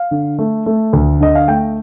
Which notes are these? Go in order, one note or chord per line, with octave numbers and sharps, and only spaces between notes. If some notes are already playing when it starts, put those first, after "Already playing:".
Already playing: F5
D3
A3
A3
D2
D3 D#5
F5
A3 G5